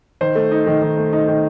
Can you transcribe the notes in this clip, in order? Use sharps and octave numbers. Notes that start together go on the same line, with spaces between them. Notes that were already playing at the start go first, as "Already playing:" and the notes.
D#3 C5
A3
D#4
D#3
D#3
A3
D#4
D#3